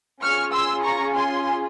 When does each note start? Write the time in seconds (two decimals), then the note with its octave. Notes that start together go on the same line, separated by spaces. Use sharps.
0.21 C#4 F4 G#4 C#6 F6
0.52 C6 E6
0.83 A#5 C#6
1.14 G#5 C6